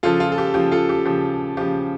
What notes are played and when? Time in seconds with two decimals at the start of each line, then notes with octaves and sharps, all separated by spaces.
0.03 C#3 F3 F4 A4
0.20 F4
0.32 A4
0.38 G4
0.54 C#3 F3 G4
0.71 F4 A4
0.89 G4
1.06 C#3 F3 G4
1.57 C#3 F3 G4